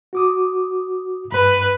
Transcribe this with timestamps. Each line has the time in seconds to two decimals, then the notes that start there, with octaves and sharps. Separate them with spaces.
0.13 F#4 D6 D#6
1.32 G2 B4